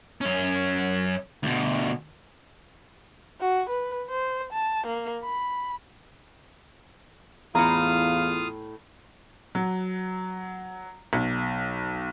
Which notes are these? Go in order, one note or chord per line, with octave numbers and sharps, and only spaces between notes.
F#2 C#4
D2 B2
F#4
B4
C5
A5
A#3
B5
E2 A2 F4 F5 A#5 D#6
F#3
B1